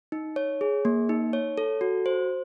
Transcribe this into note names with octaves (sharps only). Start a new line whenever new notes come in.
D#4
C#5
G#4
A#3
D#4
C#5
A4
F#4
C5